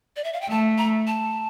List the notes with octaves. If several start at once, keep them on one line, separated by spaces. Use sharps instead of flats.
D5
E5
F5
G5
A3 A5
A#5
A5